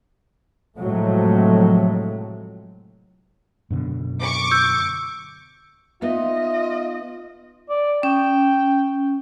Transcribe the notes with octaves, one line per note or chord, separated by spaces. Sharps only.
A2 C3 F3 F#3 G#3 A3
F#2 B2 D3
C#6 D6
E6 G6
B3 D#4 F4 D#5 E5
D5
C#4 G5